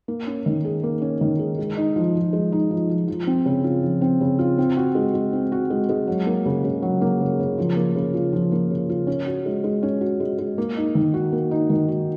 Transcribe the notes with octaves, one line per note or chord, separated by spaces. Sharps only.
A#3
C#4
D#3
G#4
A#3
C#4
D#3
G#4
G#3
D#4
F3
F3
G#3
D#4
F3
F3
F3
C4
C#3
F4
F3
C4
C#3
F4
C4
F#4
G#3
G#3
C4
F#4
G#3
G#3
F#3
A#3
C#3
C#3
F#3
A#3
C#3
C#3
F3
A#3
C#3
F4
F3
A#3
C#3
F4
C#4
F#4
G#3
G#3
C#4
F#4
G#3
G#3
A#3
D#4
D#3
F#4
A#3
D#4
D#3
F#4